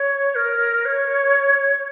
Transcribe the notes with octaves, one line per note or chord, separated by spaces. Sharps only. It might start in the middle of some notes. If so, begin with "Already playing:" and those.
Already playing: C#5
A#4
C#5